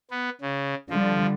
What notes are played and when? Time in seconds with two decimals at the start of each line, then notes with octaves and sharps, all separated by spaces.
0.11 B3
0.41 C#3
0.90 D3 F3 G3